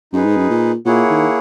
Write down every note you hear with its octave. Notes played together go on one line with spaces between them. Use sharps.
F#2 D#4 G#4 B4
G#2
F#2
A#2
A#2 A#3 E4 G#4 C#5 F#5
D#3